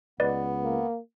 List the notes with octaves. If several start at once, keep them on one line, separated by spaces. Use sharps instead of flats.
C#2 B3 B4 D5 D#5
A#3